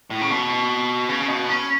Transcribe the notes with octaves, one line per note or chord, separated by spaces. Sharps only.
A2
C#3
B2
C#3
B2
B3
C#4